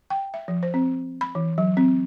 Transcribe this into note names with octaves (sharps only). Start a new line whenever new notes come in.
G5
E5
F3
C5
C4
B5
E3
F#3
C4